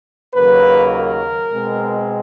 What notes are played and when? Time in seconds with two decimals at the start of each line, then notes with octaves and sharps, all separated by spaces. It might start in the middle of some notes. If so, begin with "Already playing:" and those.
0.35 D#2 C#3 F#3 A#3 B4
0.93 A#4
1.51 B2 G#3 C4